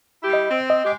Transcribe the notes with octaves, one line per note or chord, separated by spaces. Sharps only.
G3 E4 G4
D#5
C4
D#5
G#3 G4